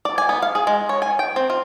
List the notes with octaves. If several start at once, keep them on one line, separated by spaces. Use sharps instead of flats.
D5
G#5
B3
F5
G#4
G#3
C#5
G#5
G5
C4
F4